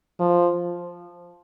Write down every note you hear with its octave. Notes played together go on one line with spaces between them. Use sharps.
F3